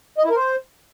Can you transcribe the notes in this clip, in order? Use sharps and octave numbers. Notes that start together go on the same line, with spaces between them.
D#5
E4
A#4
C5